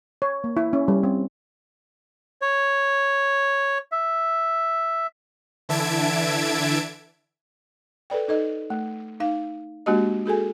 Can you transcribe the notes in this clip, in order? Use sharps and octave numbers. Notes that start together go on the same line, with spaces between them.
C#5
A#3
E4
C#4
G3
C4
C#5
E5
D3 E3 E5 A5 G#6 D7
A4 B4 D5 G5
D#4 A4 D#5
A3
D#4 F5
G#3 A#3 D4 F#4 G4 D#5
F#4 G#4 A4 G#5